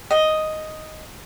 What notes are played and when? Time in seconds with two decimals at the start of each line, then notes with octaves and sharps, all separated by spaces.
0.11 D#5